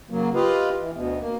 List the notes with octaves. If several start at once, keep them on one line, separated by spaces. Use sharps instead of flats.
C#3 F#3 A#3
F4 G4 B4 D#5 F5
E3
D2 B2
A#3